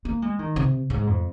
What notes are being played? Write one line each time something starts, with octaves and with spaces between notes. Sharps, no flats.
A#3
G#3
D#3
C3
G#2
F2